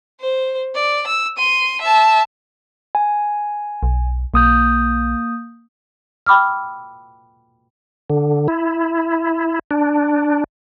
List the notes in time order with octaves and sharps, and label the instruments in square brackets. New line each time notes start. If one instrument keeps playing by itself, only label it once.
[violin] C5
D5
E6
C6 D#7
E5 A5
[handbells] G#5
[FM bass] B1
[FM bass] B1 [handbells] A#3 D#6 G6
[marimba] G5 B5 D6 E6 F6
[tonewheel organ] D3
E4
D4